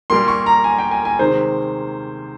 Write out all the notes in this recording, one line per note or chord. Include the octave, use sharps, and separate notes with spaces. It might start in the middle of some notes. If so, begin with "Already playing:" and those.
A#2 G3 A#3 C6
C#6
A#5
G#5
G5
G#5
G#5
C3 D#3 G#3 C5